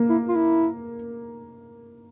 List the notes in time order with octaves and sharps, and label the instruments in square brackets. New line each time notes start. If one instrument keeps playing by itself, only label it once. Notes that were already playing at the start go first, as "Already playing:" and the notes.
Already playing: [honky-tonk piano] A#3
[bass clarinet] E4
F4
E4